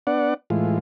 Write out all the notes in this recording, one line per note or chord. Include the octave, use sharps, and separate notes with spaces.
B3 D4 D5 F#5
A2 E3 G#3 F4